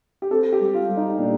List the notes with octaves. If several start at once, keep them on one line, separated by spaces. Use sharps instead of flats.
G4
C4 A4
G4
G3
F4
G3
D#4
A#2 D4